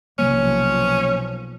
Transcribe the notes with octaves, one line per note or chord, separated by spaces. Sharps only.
B1 C3 F3 F#3 A#3 C#4